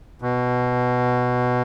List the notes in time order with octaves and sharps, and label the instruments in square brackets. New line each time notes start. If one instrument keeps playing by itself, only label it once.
[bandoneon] B2